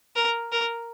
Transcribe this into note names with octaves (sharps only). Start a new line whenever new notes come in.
A#4
A#4